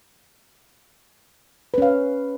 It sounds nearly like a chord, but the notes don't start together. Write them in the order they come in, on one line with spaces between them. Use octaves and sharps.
B4 C#4 F5